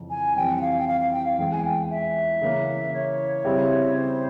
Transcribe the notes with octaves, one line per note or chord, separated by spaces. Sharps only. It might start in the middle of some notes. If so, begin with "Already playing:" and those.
Already playing: F2 C#3 E3
G#5
F2 E3 G3 C4 G5
G5
F5
G5
F5
F5
G5
F5
E2 E3 G#3 G5
G#5
G5
E5
C#3 E3 A#3
C#5
C#3 G3 C4 E4 G4
C5